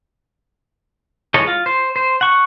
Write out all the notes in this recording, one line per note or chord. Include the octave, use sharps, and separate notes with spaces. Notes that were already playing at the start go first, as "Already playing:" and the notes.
E3 G#3 A4 C#5 D#5
F4
C5
C5
F#5 C#6